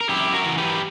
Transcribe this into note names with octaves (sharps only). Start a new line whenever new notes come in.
A#4
F#2 E4 G4
F#4 A#4
E3
G4 B4